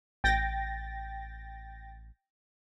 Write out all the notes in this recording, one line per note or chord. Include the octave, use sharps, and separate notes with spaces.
A1 G5 A6 A#6